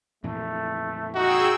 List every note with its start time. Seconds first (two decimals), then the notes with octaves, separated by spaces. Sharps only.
0.24 F2 A#2 E3 A3
1.15 D#4 F#4 G#4 G5 E6